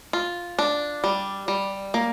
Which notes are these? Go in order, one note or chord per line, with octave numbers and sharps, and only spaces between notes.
F4
D4
G3
G3
A#3